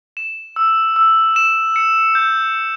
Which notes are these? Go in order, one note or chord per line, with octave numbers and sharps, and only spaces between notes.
E7
E6
E6
E7
C#7
G6
G6